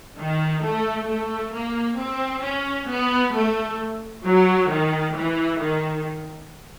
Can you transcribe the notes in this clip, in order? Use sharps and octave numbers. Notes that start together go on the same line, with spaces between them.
D#3
A3
A3
A#3
C4
C#4
B3
A3
F#3
D#3
E3
D#3